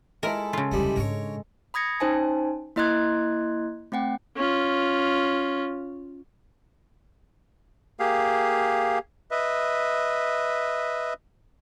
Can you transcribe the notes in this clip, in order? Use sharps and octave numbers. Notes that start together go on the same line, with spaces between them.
G#3 E4 A4 A#4 A5
C#3 F4
F1 D2 E3 G3 D#4
G#2 D4 A#4 C#5
B5 D#6 G#6 A#6 C#7
C#4 D#4 C5 G#5 A5
A#3 E4 D#5 C6 F#6 G#6
A3 C4 F#5 G5
C#4 F4
A#3 G4 G#4 F5
B4 D#5 E5